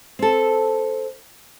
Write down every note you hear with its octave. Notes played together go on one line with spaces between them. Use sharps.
C4 A4